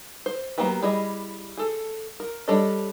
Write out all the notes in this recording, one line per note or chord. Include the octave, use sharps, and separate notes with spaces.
C5
F#3 A#3 B3 G4 B4
G3 E4 G#4 D#5
G#4 A4
A#4
G3 D4 A4 C#5 D#5